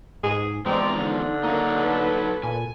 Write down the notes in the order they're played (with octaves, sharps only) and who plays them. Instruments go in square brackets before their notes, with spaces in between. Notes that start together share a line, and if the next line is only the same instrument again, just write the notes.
[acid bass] G#2 [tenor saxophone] G#4
[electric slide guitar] E2 F3 [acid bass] G#3 [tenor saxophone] C4 [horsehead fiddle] D5 A#5
[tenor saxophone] D3 [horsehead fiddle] D#4
[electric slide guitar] F#3 D#4 [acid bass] A#3 [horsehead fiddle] D4 A#4
[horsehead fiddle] A4 B4
[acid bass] A#2 [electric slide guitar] G#5